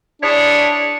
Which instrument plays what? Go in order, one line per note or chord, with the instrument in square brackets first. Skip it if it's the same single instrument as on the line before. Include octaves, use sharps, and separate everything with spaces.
[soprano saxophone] D4 [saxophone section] E4 G#4 C#5